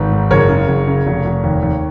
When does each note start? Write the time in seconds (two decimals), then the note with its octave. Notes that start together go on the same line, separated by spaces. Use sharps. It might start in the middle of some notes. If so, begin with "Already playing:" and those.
Already playing: G#1 B4
0.12 G#2
0.31 F#1 A#4 C#5
0.49 C#3
0.68 F#1
0.87 C#3
1.06 F1
1.25 F1
1.43 D#2
1.62 D#2